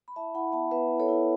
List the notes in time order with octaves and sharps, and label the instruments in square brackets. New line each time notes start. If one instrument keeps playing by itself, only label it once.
[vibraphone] B5
E4 E5 A5
E4 F#5 B5
B3 E5 A5
B3 B4 E5
E4
A4 C#5
E4